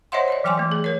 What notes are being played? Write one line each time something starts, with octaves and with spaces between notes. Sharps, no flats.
C5 C#5 D#5 E5 F#5 C6
C#5 D5 E5
E3 F#3 G5 G#5 C6
E3 A3
G#4
A3 A#4 C#5